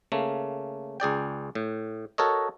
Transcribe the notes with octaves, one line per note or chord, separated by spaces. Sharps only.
C#3 A3 A#3
C#2 G#4 D5 G5
A2
F#4 A4 A#4 C#5 D#5